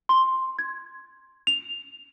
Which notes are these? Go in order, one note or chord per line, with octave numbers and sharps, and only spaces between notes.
C6
G#6
F7